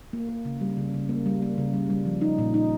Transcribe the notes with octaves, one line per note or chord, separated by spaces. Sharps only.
A#3
A#3
C#3
G3
C#3
C#3
A#3
G3
A#3
C#3
G3
G3
F3
D#4
A#2
D#4